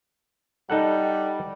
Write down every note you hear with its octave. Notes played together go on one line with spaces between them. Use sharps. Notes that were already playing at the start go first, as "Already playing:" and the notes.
G3 D#4 A4 F#5